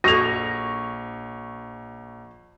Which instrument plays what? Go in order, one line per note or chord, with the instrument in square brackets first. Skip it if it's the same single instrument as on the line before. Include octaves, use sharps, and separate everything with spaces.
[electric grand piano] A#1 C#6 [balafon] F#4 A4 [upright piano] A#6 F7